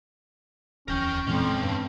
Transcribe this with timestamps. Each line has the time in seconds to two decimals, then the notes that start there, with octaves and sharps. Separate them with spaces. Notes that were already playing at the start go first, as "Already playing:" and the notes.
0.88 D1 E2 C#4 A#4 G5
1.27 F2 A#2 E3 G#3 C4 C#4
1.62 G2